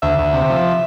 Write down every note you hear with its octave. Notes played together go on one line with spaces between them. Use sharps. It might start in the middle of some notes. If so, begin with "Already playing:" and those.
D2 E5
D2
C3
F3